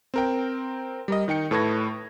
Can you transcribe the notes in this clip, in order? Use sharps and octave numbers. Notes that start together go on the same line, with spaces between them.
C4 A#4 G5
G3 A#4 D#5
D#3 D#4 G5 C#7
A2 A4 B4 C#6 G#6 A#6